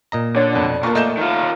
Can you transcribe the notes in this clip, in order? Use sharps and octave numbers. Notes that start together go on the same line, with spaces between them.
A#2 D#5 A#5
D3 C#5 D5
F2 B2
A#2 A#3 F4 A#4 A5 C#6
A3 D#5 G6 E7
D#3 F4